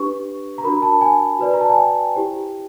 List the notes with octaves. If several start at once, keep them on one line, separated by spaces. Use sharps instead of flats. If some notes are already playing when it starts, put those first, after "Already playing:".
Already playing: D4 G4 B4 C#6
A#5
D4 F#4 A#4 B5
A5
G#5
F#4 B4 D5
A#5
A5
G#5
G5
E4 G4 C5